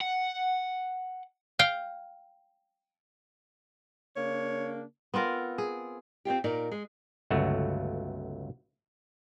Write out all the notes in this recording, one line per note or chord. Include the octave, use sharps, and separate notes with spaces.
F#5
F5 G5
C#3 A#3 D4 C#5
B3 C4 F4 A#4
G#4
C4 D#4 F4 G4
A#2 D#4 A#4 D5
G#3
G1 C#2 F#3 A3 F#4